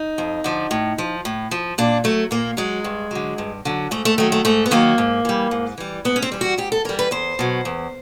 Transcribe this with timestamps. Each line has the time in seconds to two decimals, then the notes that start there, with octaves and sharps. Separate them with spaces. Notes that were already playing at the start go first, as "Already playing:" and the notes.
Already playing: D#4
0.18 F2
0.44 D3 F3
0.71 A2
0.98 F3
1.25 A2
1.51 F3
1.78 A#2 D4
2.04 F#3 A3
2.31 A#2 A#3
2.57 F#3 G#3
2.84 G2
3.11 D3 F#3
3.38 G2
3.65 D3 F#3
3.91 G#2 A3
4.05 A3
4.18 D#3 F#3 A3
4.32 A3
4.45 G#2 A3
4.66 B3
4.71 D#3 F#3 A#3
4.98 G#2
5.25 E3 G3
5.51 G#2
5.78 E3 G3
6.05 G#2 B3
6.16 C#4
6.22 C4
6.32 E3 G3
6.41 F#4
6.58 G#2 G4
6.72 A4
6.85 E3 G3 A#4
6.99 B4
7.11 E2 C5
7.39 B2 F#3
7.65 E2